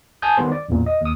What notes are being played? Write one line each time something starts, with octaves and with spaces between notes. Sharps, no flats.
G#5 A5 D#6 G6
D#3 G3 B3 C5
D5
A1 E2 A#2
D#5
D#2 D#6